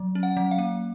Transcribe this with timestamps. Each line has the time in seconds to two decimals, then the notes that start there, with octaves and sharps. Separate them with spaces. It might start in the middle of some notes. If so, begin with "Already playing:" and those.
Already playing: F#3
0.15 C#4
0.23 F#5
0.37 F#3
0.51 F5
0.58 A#3